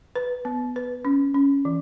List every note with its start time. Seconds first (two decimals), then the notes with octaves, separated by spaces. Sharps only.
0.15 B4
0.45 B3
0.76 B4
1.05 C#4
1.34 C#4
1.65 E3